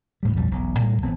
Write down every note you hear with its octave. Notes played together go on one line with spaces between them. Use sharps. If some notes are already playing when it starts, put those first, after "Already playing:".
D2 A2 G3
B1 F2 F#3 G3
E1 B1
A2 G3 G#3
G1 E3 B3 C4